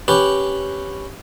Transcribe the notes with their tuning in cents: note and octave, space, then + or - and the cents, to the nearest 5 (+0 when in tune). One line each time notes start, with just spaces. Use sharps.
C#4 +0 G4 +0 B4 +0